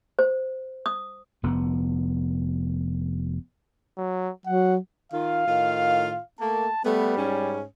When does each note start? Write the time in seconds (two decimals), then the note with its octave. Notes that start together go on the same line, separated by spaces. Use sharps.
0.19 C5
0.86 D#6
1.43 F1 B3
3.97 F#3
4.46 F#3 F#5
5.12 D#3 F4 F5
5.47 A2 D#3 F4
6.40 A3 A#3 A5
6.85 G3 A3 B3
7.17 G#2 C#4